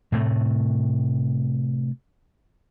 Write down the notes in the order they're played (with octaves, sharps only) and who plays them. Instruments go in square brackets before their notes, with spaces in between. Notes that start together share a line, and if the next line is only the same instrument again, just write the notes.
[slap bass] A2 C3 A3